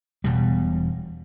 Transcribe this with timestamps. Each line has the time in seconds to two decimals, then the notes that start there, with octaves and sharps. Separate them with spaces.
0.24 E1 B2 G3